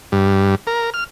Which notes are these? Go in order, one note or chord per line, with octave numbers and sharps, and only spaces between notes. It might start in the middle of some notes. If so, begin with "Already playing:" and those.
G2
A#4
F6